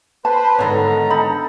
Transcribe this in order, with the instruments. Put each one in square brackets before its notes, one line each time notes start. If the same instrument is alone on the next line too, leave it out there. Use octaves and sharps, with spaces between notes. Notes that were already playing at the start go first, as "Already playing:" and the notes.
[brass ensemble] B4 C5 [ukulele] A5
[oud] G#2 D3 C#5 [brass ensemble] D#3 A#5 [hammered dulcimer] B3 A4
[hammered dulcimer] D#4 A4 [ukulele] B5